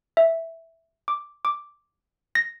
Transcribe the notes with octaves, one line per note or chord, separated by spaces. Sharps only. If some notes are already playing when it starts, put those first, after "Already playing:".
E5
D6
D6
A#6